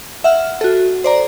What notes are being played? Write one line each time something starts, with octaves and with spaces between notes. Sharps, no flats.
E5 F#5 F6
F#4 A4
C5 D5 A#5